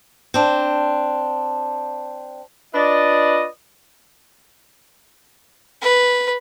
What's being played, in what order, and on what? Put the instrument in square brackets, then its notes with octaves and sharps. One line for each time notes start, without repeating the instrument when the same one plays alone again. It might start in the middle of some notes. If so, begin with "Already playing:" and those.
[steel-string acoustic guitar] C4 D4
[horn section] D4 F4 B4 D5 D#5
[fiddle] B4